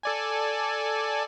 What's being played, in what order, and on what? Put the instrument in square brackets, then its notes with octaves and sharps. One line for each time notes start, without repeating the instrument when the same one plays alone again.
[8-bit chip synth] A4 D5 G#5